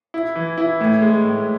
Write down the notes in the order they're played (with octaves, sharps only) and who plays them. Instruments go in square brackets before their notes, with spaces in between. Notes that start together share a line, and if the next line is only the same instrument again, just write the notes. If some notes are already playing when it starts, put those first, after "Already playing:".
[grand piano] E4
E3
E4
A2
G#3
A2